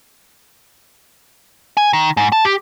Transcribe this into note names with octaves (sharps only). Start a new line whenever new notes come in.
G#5
D#3
G#2
A5
G4